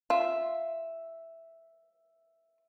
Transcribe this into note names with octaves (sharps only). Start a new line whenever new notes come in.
F4 E5